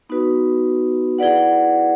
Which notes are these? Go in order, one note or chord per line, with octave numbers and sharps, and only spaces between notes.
B3 D#4 F#4 B4
E4 G#4 B4 D5 F#5